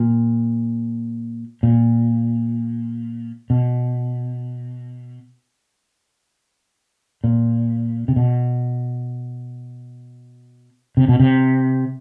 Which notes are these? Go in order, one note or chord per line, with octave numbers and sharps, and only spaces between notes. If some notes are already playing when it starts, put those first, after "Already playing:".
Already playing: A#2
A#2
B2
A#2
C3
B2
C3
B2
C3